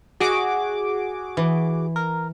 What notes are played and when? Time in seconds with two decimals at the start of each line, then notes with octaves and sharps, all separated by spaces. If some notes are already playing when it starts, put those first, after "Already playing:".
0.20 F#4 G#4 D#5 D6
1.37 E3
1.96 A#4